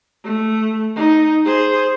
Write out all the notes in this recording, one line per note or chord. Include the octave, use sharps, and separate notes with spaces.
A3
D#4
G#4 C5